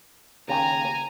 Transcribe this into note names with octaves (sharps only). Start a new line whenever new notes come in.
D#2 C#3 G5 G#5 A#5